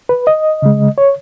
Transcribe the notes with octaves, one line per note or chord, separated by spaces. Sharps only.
B4
D#5
C#3 G#3
C#5